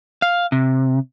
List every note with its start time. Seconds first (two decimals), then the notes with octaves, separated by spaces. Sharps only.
0.22 F5
0.52 C3